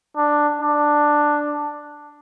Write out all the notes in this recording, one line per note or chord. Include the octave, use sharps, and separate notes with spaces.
D4
D4